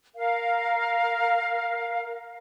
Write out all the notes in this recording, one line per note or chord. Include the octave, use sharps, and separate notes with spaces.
A#4 F5